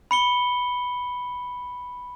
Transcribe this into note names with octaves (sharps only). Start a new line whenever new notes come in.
B5 C#7 G7